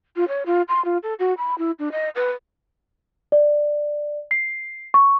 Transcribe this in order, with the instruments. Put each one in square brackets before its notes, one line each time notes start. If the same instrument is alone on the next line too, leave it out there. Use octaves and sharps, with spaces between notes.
[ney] F4
C#5
F4
C6
F4
A4
F#4
B5
E4
D4
D#5
B4
[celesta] D5
C7
C#6